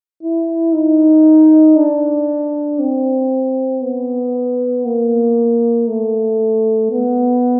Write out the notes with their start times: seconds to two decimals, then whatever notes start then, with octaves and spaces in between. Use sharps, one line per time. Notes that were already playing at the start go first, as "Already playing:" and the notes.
0.23 E4
0.73 D#4
1.76 D4
2.79 C4
3.81 B3
4.85 A#3
5.87 A3
6.91 B3